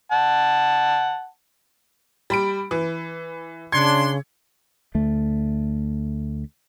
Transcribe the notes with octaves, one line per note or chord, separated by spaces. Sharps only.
F#5 A5
G3 B5 D7
E3
C#3 D4 C6 G#6 C#7
D2 A3